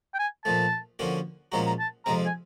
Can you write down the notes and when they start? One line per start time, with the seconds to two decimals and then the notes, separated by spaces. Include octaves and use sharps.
0.14 G5
0.19 G#5
0.45 A#2 F3 A3 A5
0.99 D3 F3 A#3 C#4 F#4
1.52 A#2 F3 G#3 C#4 F#4 A#5
1.67 A#5
1.79 A5
2.06 F2 C3 F3 G#3 C4 A#5
2.26 G#5